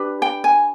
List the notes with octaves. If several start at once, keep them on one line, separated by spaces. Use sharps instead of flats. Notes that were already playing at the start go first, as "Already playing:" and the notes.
Already playing: D4 G4 B4
G5
G#5